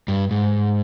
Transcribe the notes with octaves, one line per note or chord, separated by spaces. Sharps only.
G2
G#2